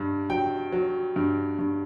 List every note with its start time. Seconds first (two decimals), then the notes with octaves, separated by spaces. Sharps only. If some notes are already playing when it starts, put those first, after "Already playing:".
Already playing: G2
0.30 F#3 G5
0.72 F#3
1.16 G2
1.59 G2